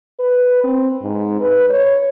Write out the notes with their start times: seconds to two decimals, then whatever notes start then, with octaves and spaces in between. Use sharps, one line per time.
0.20 B4
0.64 C4
1.02 G#2
1.41 B4
1.70 C#5